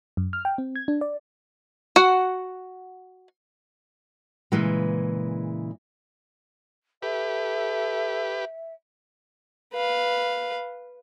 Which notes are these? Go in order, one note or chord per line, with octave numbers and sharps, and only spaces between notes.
F#2
F6
G5
C4
G#6
D4
D5
F#4 F#5
A#2 C#3 E3 G#3
G4 A4 B4 E5
B4 F5